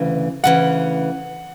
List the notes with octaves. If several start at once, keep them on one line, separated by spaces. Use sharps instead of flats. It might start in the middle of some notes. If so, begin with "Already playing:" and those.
Already playing: D2 C#3 E3
D2 C#3 E3 F#5